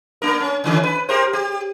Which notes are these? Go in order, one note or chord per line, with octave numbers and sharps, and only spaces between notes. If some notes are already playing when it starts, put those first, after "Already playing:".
A#3 D4 A#4
C#4
D3 D#3 C#4
B4
G4 A#4 C5
G4